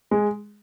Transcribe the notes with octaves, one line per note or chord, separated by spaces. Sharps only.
G#3